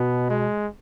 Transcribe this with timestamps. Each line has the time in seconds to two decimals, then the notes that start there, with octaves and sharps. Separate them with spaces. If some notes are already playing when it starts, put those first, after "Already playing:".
Already playing: B2 B3
0.30 G#3